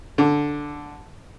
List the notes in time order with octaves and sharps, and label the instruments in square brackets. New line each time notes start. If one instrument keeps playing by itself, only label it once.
[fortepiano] D3